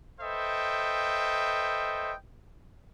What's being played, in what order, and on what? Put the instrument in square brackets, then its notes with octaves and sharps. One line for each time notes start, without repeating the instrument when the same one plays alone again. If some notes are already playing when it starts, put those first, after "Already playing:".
[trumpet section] A4 B4 C5 D#5 E5 G5